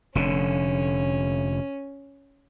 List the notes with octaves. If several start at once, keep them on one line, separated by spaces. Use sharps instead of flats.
F1 D3 C#4